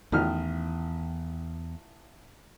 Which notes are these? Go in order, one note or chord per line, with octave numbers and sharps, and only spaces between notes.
A1 E2 D#3 F6